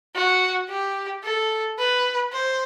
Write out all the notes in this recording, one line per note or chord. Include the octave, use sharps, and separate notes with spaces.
F#4
G4
A4
B4
C5